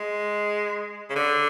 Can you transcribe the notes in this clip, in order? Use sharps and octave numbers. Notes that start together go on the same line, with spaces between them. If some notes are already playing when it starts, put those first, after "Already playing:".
Already playing: G#3
C#3
D3